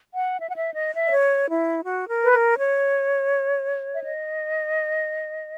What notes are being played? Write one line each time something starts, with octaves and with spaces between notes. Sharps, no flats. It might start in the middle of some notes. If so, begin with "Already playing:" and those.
F#5
E5
F#5
E5
D#5
E5
D#5
C#5
E4
F#4
A#4
B4
A#4
C#5
E5
D#5